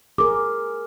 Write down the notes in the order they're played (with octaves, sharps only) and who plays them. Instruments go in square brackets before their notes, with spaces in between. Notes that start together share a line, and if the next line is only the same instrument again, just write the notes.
[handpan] G#4 A#4 [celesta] D6